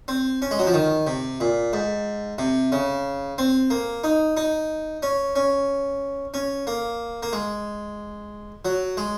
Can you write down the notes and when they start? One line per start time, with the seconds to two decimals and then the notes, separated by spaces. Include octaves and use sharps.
0.08 C4
0.42 C#4
0.51 G#3
0.59 F#3
0.67 F3
0.74 D#3
1.07 C3
1.40 A#2
1.73 G#2
2.38 C3
2.72 C#3
3.38 C4
3.70 A#3
4.04 D#4
4.37 D#4
5.03 C#4
5.36 C#4
6.34 C#4
6.67 A#3
7.23 A#3
7.33 G#3
8.65 F#3
8.97 G#3